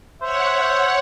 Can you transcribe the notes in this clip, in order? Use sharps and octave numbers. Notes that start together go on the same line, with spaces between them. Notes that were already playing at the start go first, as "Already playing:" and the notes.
C5 C#5 E5 F#5